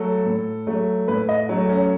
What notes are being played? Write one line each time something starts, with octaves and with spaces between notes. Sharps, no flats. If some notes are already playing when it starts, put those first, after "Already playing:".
Already playing: F#3 A3 A4
A2
F#3 A3
A2 B4
D#5
F#3 A3
C#4